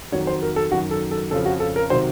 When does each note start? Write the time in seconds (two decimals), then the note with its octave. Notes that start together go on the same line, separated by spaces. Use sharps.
0.12 F2 D#3 F#3 C#5
0.27 C5
0.42 A#4
0.56 A4
0.71 F#2 D#3 F#3 F#4
0.91 A4
1.11 A4
1.31 F2 C#3 F3 A4
1.46 F#4
1.60 A4
1.76 A#4
1.90 C3 D#3 F#3 C5